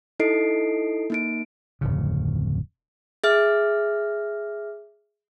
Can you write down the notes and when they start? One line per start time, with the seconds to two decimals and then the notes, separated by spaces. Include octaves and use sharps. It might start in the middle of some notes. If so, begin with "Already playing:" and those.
0.20 D#4 E4 A4 D#5 C7 D7
1.10 A#3 D#4 D7
1.81 D1 F2 C#3
3.24 G#4 E5 F6